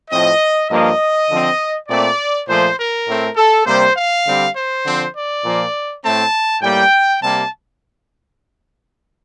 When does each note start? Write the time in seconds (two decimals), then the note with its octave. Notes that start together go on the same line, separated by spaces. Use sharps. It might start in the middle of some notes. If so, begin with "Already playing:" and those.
0.10 A2 F3 C4 D#5
0.69 G2 F3 A#3 D#5
1.29 D3 F3 C4
1.88 A#2 A3 C4 D5
2.47 A#2 F3 A3 C5
2.78 A#4
3.07 A2 A3 C4
3.36 A4
3.66 C3 G3 A#3 C5
3.95 F5
4.25 D3 G3 C4
4.55 C5
4.84 D3 F3 C4
5.14 D5
5.44 A#2 F3 A#3
6.02 A2 A3 C4 A5
6.62 A2 G3 A#3 G5
7.21 C3 G3 A#3 A5